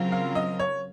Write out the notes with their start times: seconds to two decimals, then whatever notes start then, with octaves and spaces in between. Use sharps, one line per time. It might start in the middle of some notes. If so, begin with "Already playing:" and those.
Already playing: C#3 F#3 C4 F4 A#4
0.12 F5
0.35 D#5
0.59 C#5